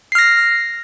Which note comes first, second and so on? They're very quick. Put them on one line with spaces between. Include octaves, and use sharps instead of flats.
C7 F6 A#6